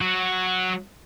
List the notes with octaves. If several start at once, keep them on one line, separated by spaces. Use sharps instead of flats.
F#3 F#4